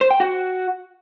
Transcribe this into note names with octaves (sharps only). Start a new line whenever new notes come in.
C5
G5
F#4